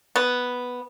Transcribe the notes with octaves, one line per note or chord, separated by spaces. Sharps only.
B3